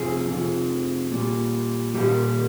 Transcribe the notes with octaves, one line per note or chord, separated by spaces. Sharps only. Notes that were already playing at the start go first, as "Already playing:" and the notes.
Already playing: F2 C3 F3 G#4
F2 C3 F3
A#2 G3
A#2 G3 G4